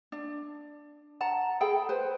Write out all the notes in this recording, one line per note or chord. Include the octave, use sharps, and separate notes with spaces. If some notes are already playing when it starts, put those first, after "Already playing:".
D4
F#5 A5 A#5
G#4 A4 G5 B5
B4 C5